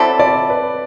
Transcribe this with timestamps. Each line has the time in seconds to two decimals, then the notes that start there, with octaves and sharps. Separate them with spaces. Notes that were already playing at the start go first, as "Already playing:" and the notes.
Already playing: F#3 C4 E4 A4 D5
0.20 D5
0.50 B4